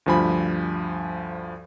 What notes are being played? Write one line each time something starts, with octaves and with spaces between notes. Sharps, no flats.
D2 G2 F3 G#5 B5